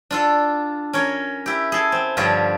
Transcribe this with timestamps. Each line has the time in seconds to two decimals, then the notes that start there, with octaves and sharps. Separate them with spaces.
0.11 D4 F4 A4
0.93 C#4 A#4 C#5
1.46 E4 G4
1.72 G#4 A4
1.92 C4
2.17 G2 D3 F3 F4 G4 C#5